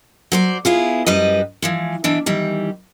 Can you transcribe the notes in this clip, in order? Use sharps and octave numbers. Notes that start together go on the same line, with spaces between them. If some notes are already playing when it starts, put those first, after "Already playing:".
F#3 C5 D5
B3 E4 F4 G#4
F#2 G3 B4 D#5
E3 F3 G#3
B2 E3 D4 E5
D#3 E3 G3